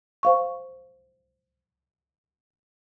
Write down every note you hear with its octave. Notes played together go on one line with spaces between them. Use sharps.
C5 F5 C#6